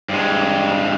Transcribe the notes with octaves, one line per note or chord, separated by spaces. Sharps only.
G2 G#3